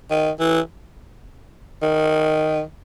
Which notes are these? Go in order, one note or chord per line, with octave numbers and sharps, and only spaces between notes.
D#3
E3
D#3